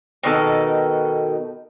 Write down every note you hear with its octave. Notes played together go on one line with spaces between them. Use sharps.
B2 D#3 A4